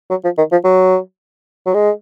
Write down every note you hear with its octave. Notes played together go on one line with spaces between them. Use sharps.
F#3
F3
D#3
F3
F#3
F#3
G#3